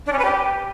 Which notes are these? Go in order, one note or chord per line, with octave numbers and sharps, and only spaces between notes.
D4
C#4
B4
G4